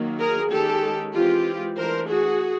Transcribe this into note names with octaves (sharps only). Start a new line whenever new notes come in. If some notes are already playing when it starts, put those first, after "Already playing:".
Already playing: D#3 F#3 A#3
G#4 A#4
D#3 G#3 C#4 G4 A4
E3 G#3 C4 F4 G4
E3 A3 D4 A#4 C5
F#4 G#4